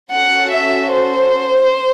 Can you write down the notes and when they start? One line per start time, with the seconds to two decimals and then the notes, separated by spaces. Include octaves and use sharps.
0.13 C#4 F#4 A4 F#5
0.53 E5
0.92 C5